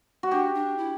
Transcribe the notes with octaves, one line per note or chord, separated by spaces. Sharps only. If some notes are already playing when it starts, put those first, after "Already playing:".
F#4
D4 G4
D4
E4